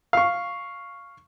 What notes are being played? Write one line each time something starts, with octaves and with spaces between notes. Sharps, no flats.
F5 C#6